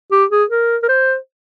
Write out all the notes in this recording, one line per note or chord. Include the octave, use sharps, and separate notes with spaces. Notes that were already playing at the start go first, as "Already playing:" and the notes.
G4
G#4
A#4
A#4
C5